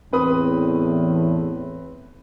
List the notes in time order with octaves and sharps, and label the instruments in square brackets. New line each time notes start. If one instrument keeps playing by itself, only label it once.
[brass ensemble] E2 A2 [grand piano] C4 B4 D#6